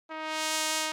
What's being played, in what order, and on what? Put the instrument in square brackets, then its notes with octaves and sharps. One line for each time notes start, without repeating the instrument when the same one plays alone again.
[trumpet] D#4